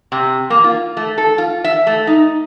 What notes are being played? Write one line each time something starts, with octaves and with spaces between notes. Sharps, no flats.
C3
A#3
F4
A3
A4
F4
E5
A3
D#4